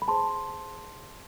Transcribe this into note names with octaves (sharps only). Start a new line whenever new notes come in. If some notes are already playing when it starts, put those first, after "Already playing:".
B5
G#4 C5 A5 C6